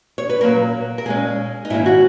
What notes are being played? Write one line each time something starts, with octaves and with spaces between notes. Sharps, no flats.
C#5
B4
A#2 F#3 A#3 C#4 A#4
A#4
A#2 G#3 C#4 G#4
D#4
G#2 D#3 A#3 C#4 E4
F#4